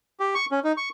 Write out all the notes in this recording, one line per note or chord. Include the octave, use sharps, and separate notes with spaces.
G4
C#6
C#4
D#4
C#6